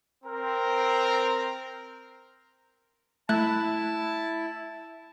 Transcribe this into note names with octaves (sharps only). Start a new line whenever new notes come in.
C4 A#4
A3 E4 A5 F#6